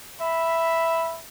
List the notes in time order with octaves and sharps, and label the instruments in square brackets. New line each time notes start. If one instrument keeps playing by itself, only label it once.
[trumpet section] E5 B5